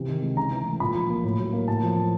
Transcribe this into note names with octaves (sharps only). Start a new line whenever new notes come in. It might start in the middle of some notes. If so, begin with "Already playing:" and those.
Already playing: C3 E3
D#3
G#3
C#3 A#5
E3
A3
A#2 B5
F3
A#3
A2
F#3
A#3
A2 A5
F3
A#3